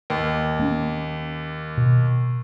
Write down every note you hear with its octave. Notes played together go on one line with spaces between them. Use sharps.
D#2
A#3 C#4
B2